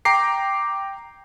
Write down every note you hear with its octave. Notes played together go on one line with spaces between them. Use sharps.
G5 A#5 D6 C7